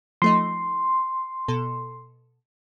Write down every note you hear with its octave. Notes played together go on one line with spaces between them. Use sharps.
F3 A3 D#4 C6
B2 A4